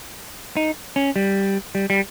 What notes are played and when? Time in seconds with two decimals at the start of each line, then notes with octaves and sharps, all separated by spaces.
0.57 D#4
0.96 C#4
1.16 G3
1.75 G3
1.90 G3